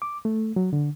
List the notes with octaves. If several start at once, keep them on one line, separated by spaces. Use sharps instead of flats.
D6
A3
F#3
D3